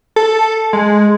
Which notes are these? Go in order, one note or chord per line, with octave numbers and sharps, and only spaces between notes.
A4
G#3